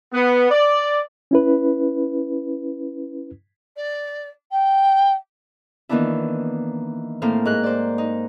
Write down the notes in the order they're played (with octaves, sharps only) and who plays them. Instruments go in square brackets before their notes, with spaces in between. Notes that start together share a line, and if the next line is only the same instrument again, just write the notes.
[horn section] B3
D5
[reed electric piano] C#4 E4 B4
[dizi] D5
G5
[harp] D#3 E3 A#3 B3 D4 E4
A2 A#3 C4 F6
G#2 A#4 F#6
C5 D5
D#4